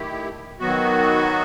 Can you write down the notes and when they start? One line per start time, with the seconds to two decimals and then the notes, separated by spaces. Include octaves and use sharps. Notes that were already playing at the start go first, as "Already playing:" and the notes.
Already playing: D#3 A3 E4 G4
0.59 D#3 F#3 B3 F#4